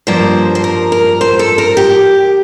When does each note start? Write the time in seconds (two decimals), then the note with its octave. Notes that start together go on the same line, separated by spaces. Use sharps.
0.07 G2 F3 A#3 C5
0.55 C5
0.64 A#4
0.92 A#4
1.21 C5
1.39 A4
1.58 A#4
1.77 G4